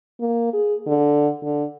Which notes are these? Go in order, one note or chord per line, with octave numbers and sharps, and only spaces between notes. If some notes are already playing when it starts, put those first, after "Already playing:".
A#3
G#4
D3
D3